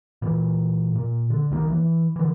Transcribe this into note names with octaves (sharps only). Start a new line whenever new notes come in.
A#2 E3
A#2
D3
C2 D#3 G3 A#3
E3
D3 E3